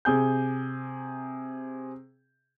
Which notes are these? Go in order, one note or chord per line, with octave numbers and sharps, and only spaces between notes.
C3 G#4 G6